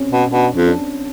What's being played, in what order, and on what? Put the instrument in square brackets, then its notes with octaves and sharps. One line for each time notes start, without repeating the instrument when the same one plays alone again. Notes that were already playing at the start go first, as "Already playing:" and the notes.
Already playing: [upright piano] C4 C#4
[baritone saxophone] B2
[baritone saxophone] B2 [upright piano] D4
[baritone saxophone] F2
[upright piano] D4